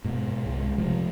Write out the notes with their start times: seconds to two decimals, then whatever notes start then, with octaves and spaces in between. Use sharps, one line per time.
0.04 G#2 B2
0.45 C2 G#3
0.78 C3 F3 A3